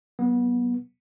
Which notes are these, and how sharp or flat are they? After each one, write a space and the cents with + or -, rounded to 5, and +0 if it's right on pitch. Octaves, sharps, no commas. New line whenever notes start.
F#3 +20 B3 -25